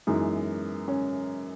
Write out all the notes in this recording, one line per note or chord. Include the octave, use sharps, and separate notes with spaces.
F#2 E3 G#3 B3 D#4
C#4